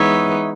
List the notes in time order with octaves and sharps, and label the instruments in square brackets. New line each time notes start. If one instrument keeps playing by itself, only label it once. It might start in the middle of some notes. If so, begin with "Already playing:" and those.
Already playing: [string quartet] E3 G#3 B3 D#4 [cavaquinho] C#5 E5